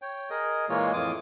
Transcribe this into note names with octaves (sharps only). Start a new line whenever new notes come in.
C#5 G5
G#4 A#4 D#5
A#2 E3 G#3 A#3 F4 C#5
F2 A2 E3 F4 D6 D#6